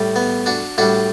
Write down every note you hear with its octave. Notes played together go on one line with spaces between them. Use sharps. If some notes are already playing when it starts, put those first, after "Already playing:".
Already playing: A2 G3
B3
D4 F#4
A2 G3 D4 F#4